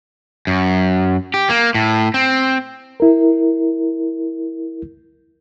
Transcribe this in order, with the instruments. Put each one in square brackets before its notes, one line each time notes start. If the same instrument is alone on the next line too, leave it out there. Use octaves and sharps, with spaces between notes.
[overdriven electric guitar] F#2
G4
A#3
A2
C4
[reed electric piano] E4 A#4